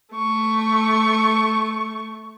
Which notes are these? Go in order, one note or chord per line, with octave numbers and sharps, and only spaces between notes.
A3 C#6